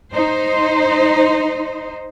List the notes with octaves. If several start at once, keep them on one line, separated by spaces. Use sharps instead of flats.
D#4 C5